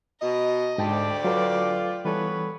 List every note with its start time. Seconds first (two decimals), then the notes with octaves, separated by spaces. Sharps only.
0.21 B2 D#5 A#5
0.78 D2 G#2 G4 D5 G5 A5
1.24 F#3 F4 A4 B4
2.05 E3 G3 B3 A4 B4 C#5